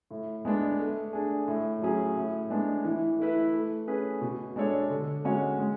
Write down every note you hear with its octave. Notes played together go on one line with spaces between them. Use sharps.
A2
G#3 B3 D4
A3
D4 G#4
A2
F#3 C#4 G#4
A2
G#3 B3 D4
E3
A3 E4 B4
A3
C#4 G#4 B4
B2
G#3 D4 A4 C#5
D3
G#3 C#4 F#4 C#5
G#3